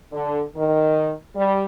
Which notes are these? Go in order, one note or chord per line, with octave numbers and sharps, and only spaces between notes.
D3
D#3
G3